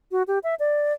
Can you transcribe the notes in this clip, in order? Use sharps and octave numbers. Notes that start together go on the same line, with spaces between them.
F#4
G4
E5
D5